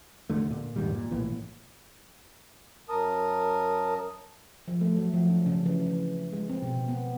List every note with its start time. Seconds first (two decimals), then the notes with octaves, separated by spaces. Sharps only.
0.29 D#2 D3 A3
0.50 A#2
0.76 E2 G#2 D#3 G3
0.94 A#2
1.11 B1 A2 E3 A#3
2.89 F#2 A#4 A5 D#6
4.68 F3
4.81 A3
4.97 F#3
5.14 F3
5.30 D4
5.46 C#3
5.66 E3
5.87 E3
6.33 G#3
6.50 C4
6.62 B2
6.88 B3